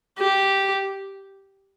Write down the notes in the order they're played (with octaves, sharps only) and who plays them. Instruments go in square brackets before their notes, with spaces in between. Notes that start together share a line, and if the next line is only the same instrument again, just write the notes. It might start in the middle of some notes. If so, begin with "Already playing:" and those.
[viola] G4